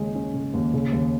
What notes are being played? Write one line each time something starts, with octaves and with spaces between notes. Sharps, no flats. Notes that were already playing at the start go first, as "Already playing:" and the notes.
Already playing: D#2 C#3 G#3
C#4
C#3
D#2
C#3
D#2